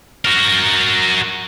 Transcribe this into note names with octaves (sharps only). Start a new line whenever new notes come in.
F#4 A#4